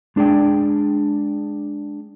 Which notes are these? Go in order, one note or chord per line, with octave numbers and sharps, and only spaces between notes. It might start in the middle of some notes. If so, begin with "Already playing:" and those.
G#3 D4 G#4 D5 G5